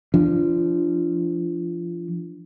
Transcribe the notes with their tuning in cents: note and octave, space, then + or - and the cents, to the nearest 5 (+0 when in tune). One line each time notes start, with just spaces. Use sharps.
F3 -25 D4 +0